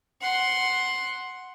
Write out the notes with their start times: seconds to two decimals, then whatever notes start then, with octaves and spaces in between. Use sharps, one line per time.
0.21 F#5 C6